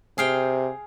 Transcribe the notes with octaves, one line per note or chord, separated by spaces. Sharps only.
C3 G#4 F5 G5